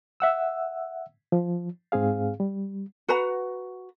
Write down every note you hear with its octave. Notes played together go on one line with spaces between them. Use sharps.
E5 F#5 E6
F3
G#2 C4 G#4 F5
G3
F#4 B4 F#5 A#5